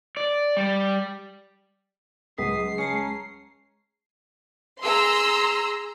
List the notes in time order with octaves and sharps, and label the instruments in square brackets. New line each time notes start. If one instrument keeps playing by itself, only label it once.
[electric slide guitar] D5
G3
[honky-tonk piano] C#2 [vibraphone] F#3 [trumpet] D#6 [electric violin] C7
[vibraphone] G#3 A5 A#5 [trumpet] C#4
[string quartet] G#4 A#5 [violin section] C6 E6